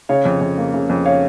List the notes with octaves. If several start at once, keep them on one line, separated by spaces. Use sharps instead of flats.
C#3 C#5 F5
F2
F2
A#3
C#3
F2
C#5 F5